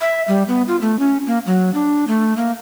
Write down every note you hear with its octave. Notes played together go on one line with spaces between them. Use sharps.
E5
G3
B3
F4
A3
C#4
A#3
F#3
D4
A3
A#3